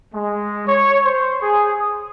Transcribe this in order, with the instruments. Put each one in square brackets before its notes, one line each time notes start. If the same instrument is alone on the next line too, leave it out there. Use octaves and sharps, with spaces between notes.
[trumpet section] G#3
C#5
C5
G#4
D#6